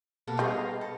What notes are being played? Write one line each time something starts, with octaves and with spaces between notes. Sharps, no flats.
B2 A#3 A4
G3 B3 G#4 D#5 F5
A4